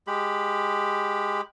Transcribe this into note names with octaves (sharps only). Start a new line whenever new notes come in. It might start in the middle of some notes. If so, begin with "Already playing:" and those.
G#3 G4 B5